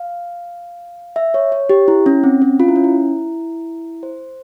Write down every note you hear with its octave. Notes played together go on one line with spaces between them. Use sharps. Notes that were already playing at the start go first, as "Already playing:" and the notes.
Already playing: F5
E5
C#5
C#5
G4
E4
C#4
C4
C#4
F4
E4
C#4
E4
C5